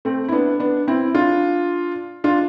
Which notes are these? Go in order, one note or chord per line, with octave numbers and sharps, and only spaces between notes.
A3 C4
E4
B3 D4
B3 D4
C4 E4
D4 F4
D4 F4